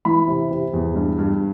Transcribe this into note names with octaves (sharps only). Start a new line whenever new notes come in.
E3 B5
C3
C3
E2
G2
G2